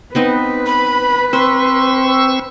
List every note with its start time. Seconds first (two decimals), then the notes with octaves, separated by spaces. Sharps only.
0.15 B3 C4 D#4 B4
0.66 B5
1.33 C4 C5 C6 C#6 E6